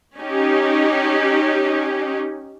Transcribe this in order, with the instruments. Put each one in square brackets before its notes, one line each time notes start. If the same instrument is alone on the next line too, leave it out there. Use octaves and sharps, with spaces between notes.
[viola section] C#4 D#4 G4